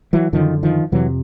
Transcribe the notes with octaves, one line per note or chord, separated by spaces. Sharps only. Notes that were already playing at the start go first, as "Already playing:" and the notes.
E3 F#3
F#2 D3 D#3 F3
D#3 F3
F2 C3 E3 F#3